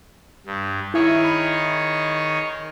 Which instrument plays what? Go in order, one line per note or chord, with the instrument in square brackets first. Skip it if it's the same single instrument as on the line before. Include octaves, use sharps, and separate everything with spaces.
[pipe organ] G2
[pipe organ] D#3 G#4 C#5 [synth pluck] E4 E5
[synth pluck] B5